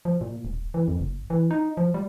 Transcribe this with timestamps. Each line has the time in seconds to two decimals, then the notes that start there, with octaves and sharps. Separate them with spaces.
0.05 F3
0.21 A#2
0.45 D#1
0.74 E3
0.88 F2
1.00 F#1
1.30 E3
1.51 D#4
1.77 F3
1.94 G3